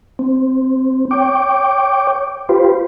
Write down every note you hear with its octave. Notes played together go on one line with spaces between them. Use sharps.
C4
C#5 G5 D6
F4 G4 B4 C5